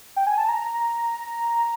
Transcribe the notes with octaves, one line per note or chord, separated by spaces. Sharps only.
G5
G#5
A5
A#5